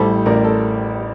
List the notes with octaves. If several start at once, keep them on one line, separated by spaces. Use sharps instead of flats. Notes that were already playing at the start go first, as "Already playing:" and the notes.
Already playing: A1 A2 G3 A4 C5
A1 A#4 D5
A4